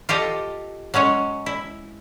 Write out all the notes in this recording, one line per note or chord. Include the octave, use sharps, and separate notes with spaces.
F4 G4 A4 D#5
F#3 G#3 C#4 C#5
E4